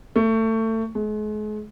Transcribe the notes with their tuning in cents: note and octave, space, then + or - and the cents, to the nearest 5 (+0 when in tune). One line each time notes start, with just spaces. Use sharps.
A3 +25
G#3 +40